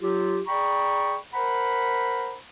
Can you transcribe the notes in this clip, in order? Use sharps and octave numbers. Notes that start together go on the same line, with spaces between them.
F#3 F4 G4
G#4 D5 G5 A#5 B5 C#6
A#4 C5 F#5 A#5 B5